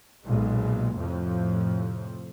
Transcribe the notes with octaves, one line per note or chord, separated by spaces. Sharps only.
B1 A#2 G#3 B3
F2 A2 C3 F3